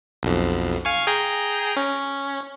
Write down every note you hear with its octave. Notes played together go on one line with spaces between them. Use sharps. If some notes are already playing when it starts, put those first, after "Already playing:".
B1 F2
F5 G#5 C#6
G#4 G5 A#5
C#4